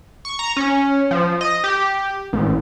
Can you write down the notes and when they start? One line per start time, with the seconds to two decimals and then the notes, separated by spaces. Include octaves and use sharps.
0.25 C#6
0.39 A#5
0.57 C#4
1.11 F3
1.41 D#5
1.64 G4
2.33 A1